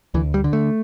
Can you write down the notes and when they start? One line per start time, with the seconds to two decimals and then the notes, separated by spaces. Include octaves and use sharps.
0.14 D2 E3
0.34 G3
0.44 D3
0.53 A3